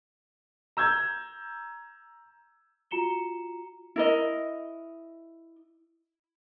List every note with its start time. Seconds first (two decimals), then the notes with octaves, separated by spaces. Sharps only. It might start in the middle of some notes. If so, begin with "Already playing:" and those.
0.77 A#5 E6 G6 G#6
2.91 F4 F#4 A#5 C#7 E7 G7
3.96 E4 A#4 D#5